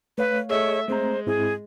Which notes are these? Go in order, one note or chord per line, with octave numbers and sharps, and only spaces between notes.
A3 B4 C#5 F5
A3 G#4 C#5 D#5 E5
G#3 A3 C4 C5 A#5
G#2 C4 E4 G#4